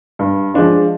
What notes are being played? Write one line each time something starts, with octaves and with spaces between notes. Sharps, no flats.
G2
F3 G#3 D4 F4